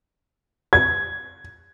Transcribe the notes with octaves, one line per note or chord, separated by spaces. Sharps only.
G#6